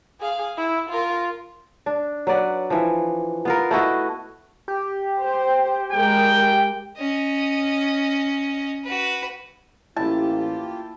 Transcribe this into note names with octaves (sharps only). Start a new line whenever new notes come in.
G#4 F5
E4
F4 A#4
D4
F#3 B4 D5 F#5
E3 F3
B3 F4 A#4
A3 E4 F#4 D#5
G4
C5
G#3 A#4 G5
C#4 D#5
F#4 B4
A1 A#3 E4 F4 G4 A5